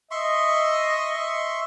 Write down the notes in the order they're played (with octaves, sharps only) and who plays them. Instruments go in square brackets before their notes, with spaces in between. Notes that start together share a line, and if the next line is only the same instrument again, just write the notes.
[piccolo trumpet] D#5 [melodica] E5 C6 C#6